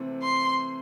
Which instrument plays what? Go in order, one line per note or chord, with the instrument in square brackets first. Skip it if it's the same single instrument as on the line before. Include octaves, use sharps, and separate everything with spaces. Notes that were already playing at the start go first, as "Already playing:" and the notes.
Already playing: [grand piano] C3 E3 A3 C4
[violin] C6